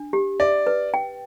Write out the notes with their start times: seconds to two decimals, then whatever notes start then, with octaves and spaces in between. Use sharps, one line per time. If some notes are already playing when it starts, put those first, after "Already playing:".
Already playing: D4
0.13 G4
0.40 D5 E5
0.67 B4
0.94 G5